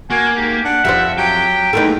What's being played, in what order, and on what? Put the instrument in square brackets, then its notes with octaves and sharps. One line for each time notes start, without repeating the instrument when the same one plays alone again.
[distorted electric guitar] A#3 [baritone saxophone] F#4 [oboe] G#5
[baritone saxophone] G#2 [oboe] G4
[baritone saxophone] D4 [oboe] F#5
[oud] F2 F4 C5 [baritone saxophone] G3 [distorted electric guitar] E5
[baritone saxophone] F#3 [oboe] G4 [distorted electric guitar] G5
[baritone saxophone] E2 [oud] A3 A#3 D#4